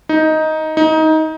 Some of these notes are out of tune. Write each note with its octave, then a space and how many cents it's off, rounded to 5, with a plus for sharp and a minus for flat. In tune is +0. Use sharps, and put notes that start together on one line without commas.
D#4 +10
D#4 +20